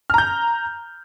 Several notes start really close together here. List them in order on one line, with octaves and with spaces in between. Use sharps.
F6 A#5 G6